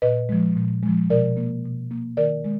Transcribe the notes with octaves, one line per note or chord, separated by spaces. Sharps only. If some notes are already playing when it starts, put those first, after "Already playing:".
A#2 B4 D#5
F3 G#3
A#2
F3 G#3
B2 A#4 D5
A#3
B2
A#3
D#3 A#4 D5
G#3